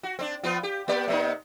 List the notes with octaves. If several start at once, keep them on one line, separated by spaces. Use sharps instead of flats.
F#4
C4 D4
F3 B3 F4
G4
A#3 G4 D5
C3 A#3 D#4